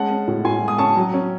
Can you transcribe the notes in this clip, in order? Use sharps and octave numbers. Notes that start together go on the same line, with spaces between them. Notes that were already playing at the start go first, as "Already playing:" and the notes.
Already playing: G#3 C#4 F#5 A5
C#4
A2
A2 G#5 C6
G#3
D#6
C#4 A5 C#6
F#3
C#4